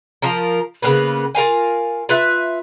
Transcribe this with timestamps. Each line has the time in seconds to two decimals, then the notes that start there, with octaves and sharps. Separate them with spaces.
0.22 F3 F4 A#4
0.82 C#3 A#3 B3 B4
1.35 F4 A#4 F5 G#5
2.09 F4 B4 E5